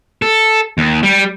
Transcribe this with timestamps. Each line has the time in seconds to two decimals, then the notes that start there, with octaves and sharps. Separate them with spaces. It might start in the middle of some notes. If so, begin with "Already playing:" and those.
0.22 A4
0.78 D#2
1.03 G3